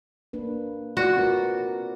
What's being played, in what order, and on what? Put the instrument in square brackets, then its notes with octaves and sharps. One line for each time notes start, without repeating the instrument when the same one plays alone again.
[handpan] A#3 D4 B4
[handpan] F4 D5 [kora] F#4
[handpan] C4 A#4 B4